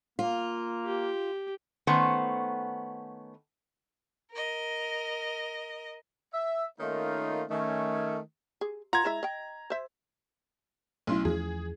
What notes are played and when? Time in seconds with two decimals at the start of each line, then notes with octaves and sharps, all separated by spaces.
0.19 A#3 F4
0.85 G4
1.87 D#3 A3 B3 C#4 C5
4.31 A#4 D#5
6.34 E5
6.79 D#3 A3 A#3 C#4 D#4 F4
7.50 D#3 A3 C#4
8.61 G#4
8.93 F4 B4 F#5 A#5 G#6
9.05 G#3 E4 E5
9.23 D#5 G5
9.70 C5 E5
11.07 B1 A3 C#4 E4 C6
11.25 E2 E3 F3 G#4